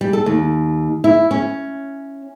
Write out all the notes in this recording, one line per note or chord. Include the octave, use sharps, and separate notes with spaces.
G3
A4
D#2
E4
C#4